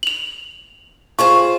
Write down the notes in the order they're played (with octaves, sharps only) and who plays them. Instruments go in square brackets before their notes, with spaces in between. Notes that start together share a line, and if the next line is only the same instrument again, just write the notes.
[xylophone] F7 F#7
[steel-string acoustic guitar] F4 G#4 C5 [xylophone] C#6